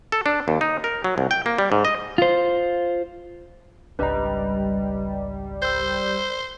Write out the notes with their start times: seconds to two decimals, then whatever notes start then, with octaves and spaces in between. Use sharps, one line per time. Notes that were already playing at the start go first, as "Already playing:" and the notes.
0.12 A4
0.26 D4
0.48 D#2
0.61 D#4
0.84 A#4
1.04 F#3
1.18 C2
1.31 G5
1.46 A#3
1.58 G3
1.72 G#2
1.85 D#5
2.18 F4 C5
3.99 G#1 C#2 G3 D4 B4 D#5 A#5
5.62 C5 E6 G6